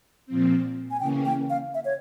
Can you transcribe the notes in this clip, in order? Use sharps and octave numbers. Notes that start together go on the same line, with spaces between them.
A#2 F3 C4
G#5
C#3 E3 A#3 C#4 G5
G5
F5
E5
C#5